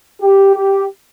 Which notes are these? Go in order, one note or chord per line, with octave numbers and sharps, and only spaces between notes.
G4
G4